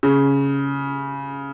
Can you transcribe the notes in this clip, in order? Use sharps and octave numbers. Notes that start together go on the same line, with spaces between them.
C#3